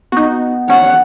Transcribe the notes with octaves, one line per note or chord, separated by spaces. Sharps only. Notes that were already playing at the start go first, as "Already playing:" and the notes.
B3 D#4 F#4
C#4 F#5